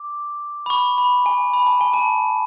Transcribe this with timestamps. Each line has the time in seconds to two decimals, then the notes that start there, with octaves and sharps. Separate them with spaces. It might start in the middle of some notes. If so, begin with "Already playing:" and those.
Already playing: D6
0.66 B5
0.70 C#6
0.98 B5
1.26 G#5
1.53 B5
1.67 A5
1.81 G#5
1.94 A5